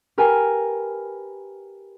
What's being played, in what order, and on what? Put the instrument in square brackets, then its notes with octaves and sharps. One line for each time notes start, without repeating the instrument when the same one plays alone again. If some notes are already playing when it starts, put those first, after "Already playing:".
[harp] G4 A#4 B4 G5 G#5